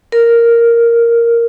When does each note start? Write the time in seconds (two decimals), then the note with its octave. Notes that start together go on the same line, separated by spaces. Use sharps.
0.12 A#4